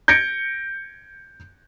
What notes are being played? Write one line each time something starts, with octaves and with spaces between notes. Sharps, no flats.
G6 G#6 A#6 C#7 D7